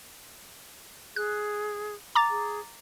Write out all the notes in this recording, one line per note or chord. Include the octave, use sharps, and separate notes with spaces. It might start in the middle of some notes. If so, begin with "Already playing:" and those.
G#4 F#6
A#5 D6 A6
G#4